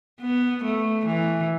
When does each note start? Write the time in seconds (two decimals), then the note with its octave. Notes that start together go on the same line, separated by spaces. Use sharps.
0.22 B3
0.64 A3
1.06 E3